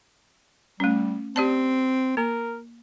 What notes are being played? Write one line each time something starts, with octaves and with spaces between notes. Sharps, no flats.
G3 A3 C#4
C4 G4 D5 A5
A#3 A#4